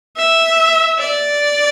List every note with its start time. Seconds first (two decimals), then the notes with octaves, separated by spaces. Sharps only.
0.17 E5
0.99 D5